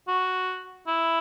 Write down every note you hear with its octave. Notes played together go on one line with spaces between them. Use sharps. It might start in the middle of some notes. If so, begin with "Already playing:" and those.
F#4
E4